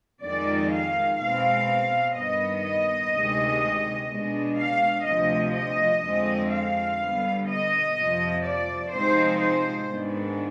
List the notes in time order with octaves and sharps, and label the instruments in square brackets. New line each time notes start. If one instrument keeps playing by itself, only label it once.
[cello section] F2 D#3 G#3 D5
F5
B2 G#3 C4 F5
G2 D#3 B3 D#5
D#5
D2 C3 D#3 G#3
B2 G#3 D4
F5
D2 C3 F3 D#5
D#5
F2 D3 G#3 C4
F5
D3 G3 B3
D#5
F2 C3 F3
D5
C3 F3 G#3 C4 D#4 C5
C5
G#2 D#3 B3 D4